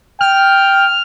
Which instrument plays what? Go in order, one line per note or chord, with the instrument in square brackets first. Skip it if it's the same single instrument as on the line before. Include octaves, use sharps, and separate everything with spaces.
[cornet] G5 [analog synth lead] F6